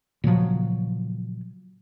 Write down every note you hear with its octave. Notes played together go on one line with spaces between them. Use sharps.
A#2 C#3 F3 F#3